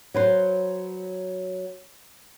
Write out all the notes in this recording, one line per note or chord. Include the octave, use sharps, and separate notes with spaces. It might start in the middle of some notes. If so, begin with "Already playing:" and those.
F#3 B4 C5